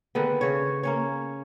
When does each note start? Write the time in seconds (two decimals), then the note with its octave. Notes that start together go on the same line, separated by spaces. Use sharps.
0.15 D3 D#3 G#3 B3
0.41 C#3 C#5
0.83 A#3 C#4 C#5